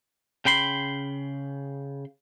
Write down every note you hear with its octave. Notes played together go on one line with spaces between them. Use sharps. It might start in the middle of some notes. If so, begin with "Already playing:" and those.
C#3 G5 B5 C6